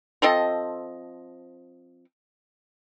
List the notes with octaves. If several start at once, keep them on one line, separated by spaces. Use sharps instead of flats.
F3 C4 A4 D#5